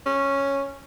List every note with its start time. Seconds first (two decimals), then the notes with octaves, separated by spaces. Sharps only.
0.06 C#4